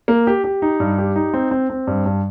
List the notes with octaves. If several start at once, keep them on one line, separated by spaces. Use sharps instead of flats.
A#3
G4
G4
D#4
G2
G4
D#4
C4
C4
C4
G2
G2